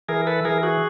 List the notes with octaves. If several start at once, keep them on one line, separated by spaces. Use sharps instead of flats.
E3 G#4 A#4
A4 B4
E3 G#4 A#4
F#4 G#4